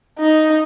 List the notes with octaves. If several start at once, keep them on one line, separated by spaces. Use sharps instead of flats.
D#4